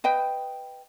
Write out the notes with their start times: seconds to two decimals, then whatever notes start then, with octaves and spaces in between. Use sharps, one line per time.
0.04 B4 D#5 G5